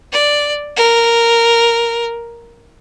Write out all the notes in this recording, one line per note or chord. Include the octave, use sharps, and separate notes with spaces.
D5
A#4